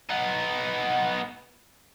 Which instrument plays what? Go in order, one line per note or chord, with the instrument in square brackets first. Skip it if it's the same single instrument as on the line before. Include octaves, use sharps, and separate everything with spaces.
[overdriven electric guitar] B3 D#4